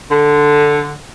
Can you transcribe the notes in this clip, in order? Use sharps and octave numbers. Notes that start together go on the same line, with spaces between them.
D3